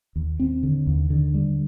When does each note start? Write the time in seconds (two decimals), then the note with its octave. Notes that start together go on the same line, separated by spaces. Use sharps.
0.16 D#2
0.40 C4
0.63 D3
0.87 D#2
1.10 D3
1.34 G3